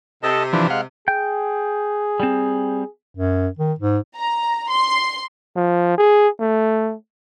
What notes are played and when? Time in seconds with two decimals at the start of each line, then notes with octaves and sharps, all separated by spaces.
0.23 C3 A4 D#5 A5
0.53 E3 F3 D4 B4
0.70 G#3 F5 F#5
1.08 G#4 G5
2.20 G3 C4
3.16 F#2
3.58 D#3
3.79 G#2
4.17 A#5
4.70 C6
5.56 F3
5.98 G#4
6.40 A3